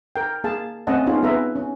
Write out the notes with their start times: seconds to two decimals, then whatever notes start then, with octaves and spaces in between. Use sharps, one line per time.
0.16 A#4 G5
0.44 A#3 G#4 F5 A5
0.87 A3 C4 C#4 D#5 F#5 A5
1.06 B3 C#4 D#4 F4 G#4
1.23 B3 G#4 A4 B4 E5 A#5
1.55 C#4